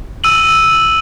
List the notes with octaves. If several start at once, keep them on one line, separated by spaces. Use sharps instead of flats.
E6 D#7 F#7